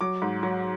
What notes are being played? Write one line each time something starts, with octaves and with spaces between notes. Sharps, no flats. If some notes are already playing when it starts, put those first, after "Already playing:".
F#3 D6
G#2
F#3